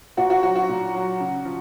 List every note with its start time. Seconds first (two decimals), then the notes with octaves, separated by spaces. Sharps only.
0.17 A#2 F#4
0.30 F#4
0.43 F#3 F#4
0.55 F#4
0.69 A#2
0.95 F#3
1.20 C#3
1.45 F3